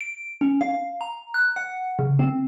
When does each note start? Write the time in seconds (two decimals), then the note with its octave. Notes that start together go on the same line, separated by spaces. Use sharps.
0.01 D7
0.41 C#4
0.61 F5
1.01 A#5
1.34 F#6
1.56 F#5
1.99 C#3
2.19 C4